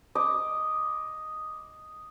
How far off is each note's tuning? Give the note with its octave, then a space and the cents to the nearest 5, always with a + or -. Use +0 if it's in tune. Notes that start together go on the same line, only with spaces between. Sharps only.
D#5 +0 D6 +0